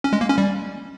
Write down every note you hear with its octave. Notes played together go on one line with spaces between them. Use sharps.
C#4
G#3
A#3
C#4
G3